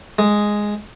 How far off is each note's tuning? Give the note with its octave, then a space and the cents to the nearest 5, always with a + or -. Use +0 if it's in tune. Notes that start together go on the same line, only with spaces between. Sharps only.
G#3 +0